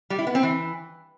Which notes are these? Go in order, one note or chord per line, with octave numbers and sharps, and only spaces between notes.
G3
E4
B3
C4
E3